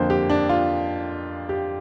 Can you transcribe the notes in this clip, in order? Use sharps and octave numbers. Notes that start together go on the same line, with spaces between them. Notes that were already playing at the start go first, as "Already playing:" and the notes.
Already playing: F2 D3 A#3 C5
G4
D4
F4
G4